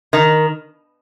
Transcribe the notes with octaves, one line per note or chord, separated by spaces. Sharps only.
D#3